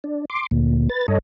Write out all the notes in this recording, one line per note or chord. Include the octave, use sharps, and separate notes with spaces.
D4
C6 D6
D2 A#2
B4 A6
G2 A4 C#5 D#5